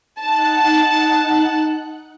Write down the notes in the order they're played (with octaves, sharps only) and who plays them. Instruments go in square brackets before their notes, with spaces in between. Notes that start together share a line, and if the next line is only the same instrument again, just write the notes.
[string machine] D#4 F#5 F#6 [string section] A5